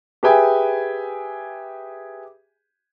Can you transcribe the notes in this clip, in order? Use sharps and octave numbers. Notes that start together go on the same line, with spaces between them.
G4 G#4 B4 E5 G5 G#5